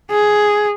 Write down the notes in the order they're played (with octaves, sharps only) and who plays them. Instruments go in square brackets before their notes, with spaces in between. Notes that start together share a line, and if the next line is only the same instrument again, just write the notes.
[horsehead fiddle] G#4